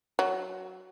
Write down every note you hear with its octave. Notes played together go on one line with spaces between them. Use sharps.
F#3